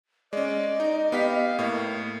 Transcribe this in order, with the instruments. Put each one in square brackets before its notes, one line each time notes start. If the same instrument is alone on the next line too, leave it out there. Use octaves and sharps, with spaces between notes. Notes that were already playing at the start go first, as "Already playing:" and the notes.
[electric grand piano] G#3 C#4 [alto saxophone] D5 [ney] D#5
[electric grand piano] D#4
[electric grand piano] B3 G4 B6 [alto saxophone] F5
[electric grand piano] A2 [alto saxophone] A#3